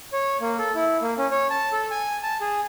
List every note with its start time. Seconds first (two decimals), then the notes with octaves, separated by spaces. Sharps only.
0.13 C#5
0.41 A#3
0.59 A4
0.75 E4
1.02 A#3
1.18 C#4
1.31 C#5
1.50 A5
1.72 A4
1.91 G#5
2.23 A5
2.41 G#4